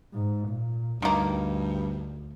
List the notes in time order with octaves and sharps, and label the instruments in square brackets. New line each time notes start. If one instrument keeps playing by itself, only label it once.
[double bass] G#2
A#2
[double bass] D2 [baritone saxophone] G2 [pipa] D#3 A#3